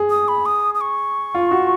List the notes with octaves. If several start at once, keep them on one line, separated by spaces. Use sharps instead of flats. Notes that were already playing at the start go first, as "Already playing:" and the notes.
Already playing: G#4
D#6
B5
D#6
D#6
C#6
F4
F#4